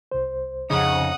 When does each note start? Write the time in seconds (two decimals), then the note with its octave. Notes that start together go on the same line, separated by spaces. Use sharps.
0.12 C2 C5
0.70 F2 C#3 D#4 F#5 D#6